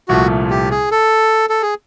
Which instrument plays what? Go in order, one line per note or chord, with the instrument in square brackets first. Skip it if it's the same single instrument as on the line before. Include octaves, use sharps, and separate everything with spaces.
[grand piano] C2 A#2 F3 A3 [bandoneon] F#4
[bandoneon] G4
G#4
A4
A4
G#4